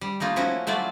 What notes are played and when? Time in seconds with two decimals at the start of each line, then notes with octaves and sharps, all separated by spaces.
0.01 G3
0.20 A3 A#3 D#4 F4
0.36 F3 C#4 E4 F#4
0.67 F#3 A3 E4 F4 D5